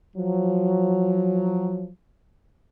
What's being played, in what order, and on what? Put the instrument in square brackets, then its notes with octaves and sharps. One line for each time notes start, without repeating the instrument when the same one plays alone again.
[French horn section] F3 F#3